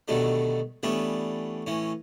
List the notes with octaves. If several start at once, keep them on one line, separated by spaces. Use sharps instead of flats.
B2 D3 D#3 G3 A3
E3 G3 A3 B3 C#4 D4
A2 E3 C#4